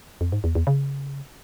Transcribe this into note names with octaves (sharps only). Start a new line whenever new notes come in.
F2
G#2
E2
E2
C#3